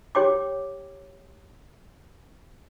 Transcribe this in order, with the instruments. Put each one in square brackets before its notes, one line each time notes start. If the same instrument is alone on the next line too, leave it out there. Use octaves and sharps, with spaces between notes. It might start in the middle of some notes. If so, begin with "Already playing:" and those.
[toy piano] G4 C#5 G5 D6